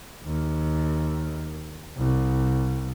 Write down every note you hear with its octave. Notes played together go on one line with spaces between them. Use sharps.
D#2
C2